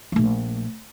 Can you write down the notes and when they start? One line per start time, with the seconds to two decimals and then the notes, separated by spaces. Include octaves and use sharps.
0.12 A#1 A3